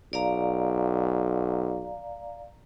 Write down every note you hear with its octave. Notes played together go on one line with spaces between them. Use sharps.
B1 D5 F5 A#5